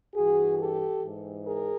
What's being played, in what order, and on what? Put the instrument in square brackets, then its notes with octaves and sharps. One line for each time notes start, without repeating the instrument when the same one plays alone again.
[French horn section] G2 E3 F#4 G#4
G4 A4
G#2 E3
G#4 A#4